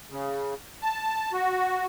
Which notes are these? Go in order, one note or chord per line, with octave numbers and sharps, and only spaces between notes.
C#3
A5
F#4